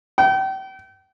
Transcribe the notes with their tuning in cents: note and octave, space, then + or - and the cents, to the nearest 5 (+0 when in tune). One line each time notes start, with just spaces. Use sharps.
G5 -35